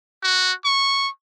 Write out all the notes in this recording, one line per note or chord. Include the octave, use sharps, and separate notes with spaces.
F#4
C#6